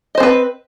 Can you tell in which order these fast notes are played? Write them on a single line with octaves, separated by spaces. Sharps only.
D#5 C5 C4 B4